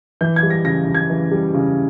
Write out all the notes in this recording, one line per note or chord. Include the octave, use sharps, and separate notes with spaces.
E3 G6
G#6
G3
A#6
C#3 A#6
C#3
G#6
E3
G3
C#3